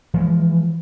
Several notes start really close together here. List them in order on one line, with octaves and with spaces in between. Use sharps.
E3 G#3 F3